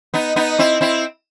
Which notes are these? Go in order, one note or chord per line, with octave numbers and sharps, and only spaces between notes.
B3 D#4
B3 D#4
C4 E4
C4 E4